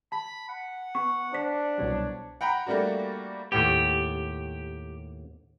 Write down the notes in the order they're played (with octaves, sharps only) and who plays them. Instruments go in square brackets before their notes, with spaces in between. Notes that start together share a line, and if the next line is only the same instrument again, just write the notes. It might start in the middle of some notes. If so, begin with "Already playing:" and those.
[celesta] A5 [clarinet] B5
[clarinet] F#5
[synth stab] B3 [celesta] C#6
[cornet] D4 [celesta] C5 B6
[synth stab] C2 B2 F#3 [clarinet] C#5
[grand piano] F#5 G5 A#5 B5
G3 A3 A#3 D4 F#4
[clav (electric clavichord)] D#2 A2 B3 [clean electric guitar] G4